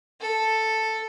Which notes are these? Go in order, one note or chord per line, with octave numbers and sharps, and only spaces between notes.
A4